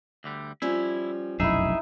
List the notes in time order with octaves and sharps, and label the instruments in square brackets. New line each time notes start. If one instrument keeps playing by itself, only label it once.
[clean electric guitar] D2 D3 G3
[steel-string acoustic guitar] F3 G3 C#4 [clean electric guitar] E4
[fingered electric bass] F1 B1 F#2 [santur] D#4 E4 [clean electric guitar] G#4 E5